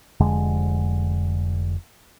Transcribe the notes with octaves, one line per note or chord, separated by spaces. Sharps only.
F1 F2 D3 G#3